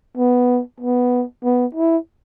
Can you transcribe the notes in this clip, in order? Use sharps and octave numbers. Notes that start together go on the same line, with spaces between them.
B3
B3
B3
E4